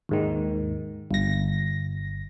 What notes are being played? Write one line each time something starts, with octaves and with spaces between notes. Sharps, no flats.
D#2 G#2 D#3
G1 A#6